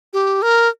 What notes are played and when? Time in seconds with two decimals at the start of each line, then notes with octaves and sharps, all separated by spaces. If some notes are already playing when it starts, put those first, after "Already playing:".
0.13 G4
0.42 A#4